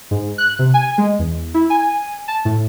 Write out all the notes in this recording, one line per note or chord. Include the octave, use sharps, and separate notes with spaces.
G#2
F#6
C3
G#5
G#3
E2
E4
G#5
A5
A2